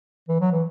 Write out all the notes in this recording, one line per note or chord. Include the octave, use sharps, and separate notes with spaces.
E3
F#3
E3